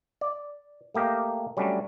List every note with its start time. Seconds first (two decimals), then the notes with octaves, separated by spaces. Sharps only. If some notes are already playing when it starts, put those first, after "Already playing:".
0.21 D5
0.95 A3 A#3 G4 A#4 D#5
1.57 F#3 G3 A3 C#4 D4